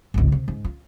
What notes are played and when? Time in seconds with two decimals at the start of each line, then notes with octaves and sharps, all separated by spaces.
0.14 G#1 C#2
0.28 C3 C4
0.48 G#2
0.65 F4